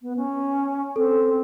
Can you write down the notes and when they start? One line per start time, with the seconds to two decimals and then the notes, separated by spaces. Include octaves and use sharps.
0.02 B3
0.17 C#4
0.96 C4 A4